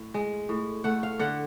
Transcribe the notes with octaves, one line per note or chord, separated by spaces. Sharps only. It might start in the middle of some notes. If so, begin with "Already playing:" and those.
Already playing: A2
G#3
A2
A3 F#5
F5
D3 F#5